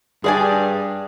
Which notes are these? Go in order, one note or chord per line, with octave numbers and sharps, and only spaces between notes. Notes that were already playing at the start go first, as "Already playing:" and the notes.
G2 G#4 D5 G#5